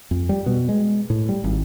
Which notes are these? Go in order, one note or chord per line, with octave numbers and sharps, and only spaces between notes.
F2
G3
B2
G#3
A2
G3
G#1